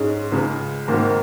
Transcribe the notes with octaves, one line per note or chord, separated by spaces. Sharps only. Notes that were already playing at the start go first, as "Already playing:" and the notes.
Already playing: G#2 G#3 C#4 G#4
C#2 C#3 G#3
G#1 G#2 D#3 A#3